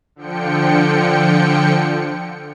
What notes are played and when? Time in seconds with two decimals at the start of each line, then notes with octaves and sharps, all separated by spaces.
0.16 D3 F3 G5 C#7